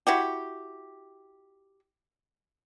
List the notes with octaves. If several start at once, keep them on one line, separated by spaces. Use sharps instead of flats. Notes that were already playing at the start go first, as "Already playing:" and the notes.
E4 F#4 G4